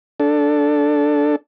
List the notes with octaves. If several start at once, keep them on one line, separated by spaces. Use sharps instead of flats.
D4 A4